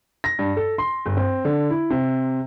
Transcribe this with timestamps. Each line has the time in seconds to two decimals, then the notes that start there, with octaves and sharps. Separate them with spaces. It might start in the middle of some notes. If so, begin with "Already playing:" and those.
0.24 A#6
0.39 G2
0.57 A4
0.78 C6
1.06 G1
1.17 C4
1.45 D3
1.70 E4
1.90 C3